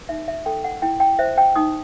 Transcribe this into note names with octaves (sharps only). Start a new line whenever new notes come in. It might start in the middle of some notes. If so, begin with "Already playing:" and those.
Already playing: B4
D#4 E5
E5
A4 G5
F#5
E4 G5
G5
C5 E5
G5
D#4 D#6